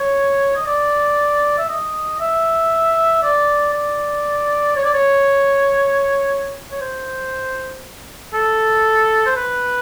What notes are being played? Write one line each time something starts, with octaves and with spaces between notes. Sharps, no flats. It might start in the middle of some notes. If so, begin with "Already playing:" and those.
Already playing: C#5
D#5
D5
E5
D#5
E5
D5
D5
C#5
D5
C#5
C#5
C5
A4
C5
B4